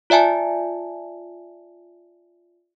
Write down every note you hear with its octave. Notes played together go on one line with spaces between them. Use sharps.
F4 D5 E5 G#5 A5